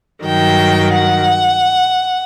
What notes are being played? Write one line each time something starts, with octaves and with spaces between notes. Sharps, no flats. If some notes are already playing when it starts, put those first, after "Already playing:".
G2 D#3 F#3 G5
F#5